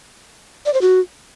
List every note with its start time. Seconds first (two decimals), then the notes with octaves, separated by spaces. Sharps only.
0.66 D5
0.74 C5
0.82 F#4